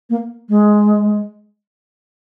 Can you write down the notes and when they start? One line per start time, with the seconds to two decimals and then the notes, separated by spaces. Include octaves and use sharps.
0.10 A#3
0.49 G#3